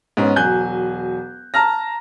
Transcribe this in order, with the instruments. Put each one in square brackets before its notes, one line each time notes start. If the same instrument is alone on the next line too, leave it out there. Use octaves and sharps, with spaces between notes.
[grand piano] G#2 B3 C#4
E1 F#3 G#5 F#6 G6
A5 A#5 F6 A#6